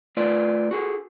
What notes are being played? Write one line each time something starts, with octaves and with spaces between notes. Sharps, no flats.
A3 F4 B4 D5
F#4 G#4 A4